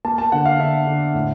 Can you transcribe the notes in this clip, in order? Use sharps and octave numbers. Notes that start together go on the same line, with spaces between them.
A#3 A5
A5
D3 F#5
F5
D3 E5
D3
A2